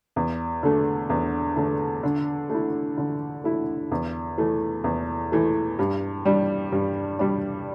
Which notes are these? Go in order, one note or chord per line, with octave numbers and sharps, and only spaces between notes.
E2
D3 A3
E2
D3 A3
D3
A3 E4
D3
A3 E4
E2
E3 A3
E2
E3 A3
G2
G3 D4
G2
G3 D4